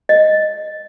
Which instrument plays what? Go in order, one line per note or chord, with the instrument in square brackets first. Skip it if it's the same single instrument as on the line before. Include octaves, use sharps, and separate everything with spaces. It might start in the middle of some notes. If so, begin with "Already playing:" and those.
[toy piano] D#5